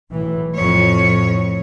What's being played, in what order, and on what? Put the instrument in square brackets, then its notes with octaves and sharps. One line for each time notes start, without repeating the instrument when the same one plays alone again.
[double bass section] B1 A2 E3
[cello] F2 C#5 [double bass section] A2